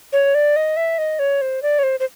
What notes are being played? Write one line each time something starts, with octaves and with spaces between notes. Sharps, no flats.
C#5
D5
D#5
E5
D#5
C#5
C5
D5
C#5
C5
C5